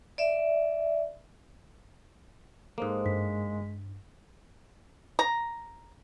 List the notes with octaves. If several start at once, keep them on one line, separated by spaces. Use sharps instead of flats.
D5 E5
G#2 G#3 A#3 A4 C5 D#6
G2 B6
A#5